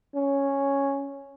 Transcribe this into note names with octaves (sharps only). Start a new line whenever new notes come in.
C#4